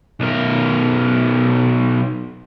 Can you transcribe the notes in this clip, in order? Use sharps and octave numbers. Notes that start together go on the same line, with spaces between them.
B1 A#4